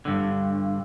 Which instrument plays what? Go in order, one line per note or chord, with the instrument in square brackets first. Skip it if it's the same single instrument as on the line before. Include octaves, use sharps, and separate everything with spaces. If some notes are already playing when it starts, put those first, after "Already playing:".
[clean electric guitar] G2 D3